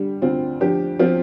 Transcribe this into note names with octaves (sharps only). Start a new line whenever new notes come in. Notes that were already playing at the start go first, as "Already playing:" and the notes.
Already playing: D3 G3
D2 C4 F4
F3 D4 G4
F3 C4 F4